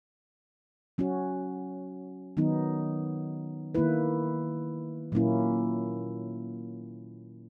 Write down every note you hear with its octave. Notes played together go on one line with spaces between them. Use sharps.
F#3 C#4 F#4
D#3 F#3 B3 D#4
D#3 A#3 E4 B4
A#2 F#3 A#3 C#4 E4